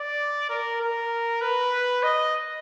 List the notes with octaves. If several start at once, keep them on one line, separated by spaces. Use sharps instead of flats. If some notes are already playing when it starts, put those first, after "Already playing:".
Already playing: D5
A#4
A#4
B4
D#5